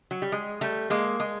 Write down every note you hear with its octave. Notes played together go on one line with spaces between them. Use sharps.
F#3
G3
G#3
G3 A3
G#3 A#3
G#3